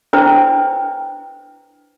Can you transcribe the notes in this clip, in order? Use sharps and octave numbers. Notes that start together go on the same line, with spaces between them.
D4 E4 B4 C5 G5